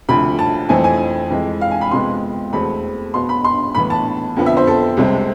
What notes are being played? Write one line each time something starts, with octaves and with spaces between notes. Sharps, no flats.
D2 C3 F3 B5
A5
F2 E3 A3 C4 G#5
G#5
F2 E3 G#3
F5
G#5
B5
F2 C3 G#3 B3 C6
E2 B2 A3 C4 B5
B2 B3 C6
B5
C6
A2 E3 B3 B5
A5
F2 D3 F3 B3
E5
C5
A4
C2 C3 G#3 C4